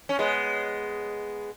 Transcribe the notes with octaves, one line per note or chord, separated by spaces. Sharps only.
C#4
G#3 B3